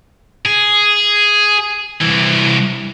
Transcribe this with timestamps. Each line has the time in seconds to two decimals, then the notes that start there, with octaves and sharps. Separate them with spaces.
0.45 G#4
2.01 C2 E3